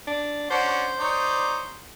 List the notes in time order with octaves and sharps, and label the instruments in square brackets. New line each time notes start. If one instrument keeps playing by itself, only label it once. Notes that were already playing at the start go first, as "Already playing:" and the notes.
[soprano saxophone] D4
[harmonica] C#4 D4 F#4 [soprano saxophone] C5
[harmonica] D#4 C#5 D5